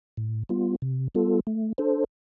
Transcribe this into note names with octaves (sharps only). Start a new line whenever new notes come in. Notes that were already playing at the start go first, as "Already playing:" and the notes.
A2
G3 B3 F4
C3
G3 B3 F4 A4
A3
D4 A4 C5